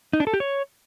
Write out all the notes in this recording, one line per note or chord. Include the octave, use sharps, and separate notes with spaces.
D#4
D4
A4
G4
C#5